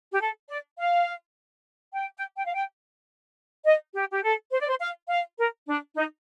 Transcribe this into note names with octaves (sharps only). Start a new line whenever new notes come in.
G4
A4
D5
F5
G5
G5
G5
F5
G5
D#5
G4
G4
A4
C5
D5
C5
F5
F5
A#4
D4
D#4